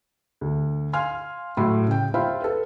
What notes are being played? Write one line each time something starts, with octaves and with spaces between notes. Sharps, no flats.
D2
F5 G#5 C6 F6
A2 F#3 B5 C6
C#3 G5
F4 C5 E5 F5 G5 B5
A4 B4